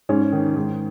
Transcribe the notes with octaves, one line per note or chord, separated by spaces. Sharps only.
G#2 C#4
D#3
G#2